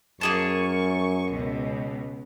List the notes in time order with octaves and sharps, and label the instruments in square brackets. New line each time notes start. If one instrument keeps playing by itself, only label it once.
[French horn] F#2 [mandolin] A#3 G#4 A5 [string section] C#6
[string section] C#2 B2